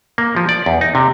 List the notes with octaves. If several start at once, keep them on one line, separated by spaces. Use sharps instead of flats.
A#3
F3
D5
E2
D#4
C3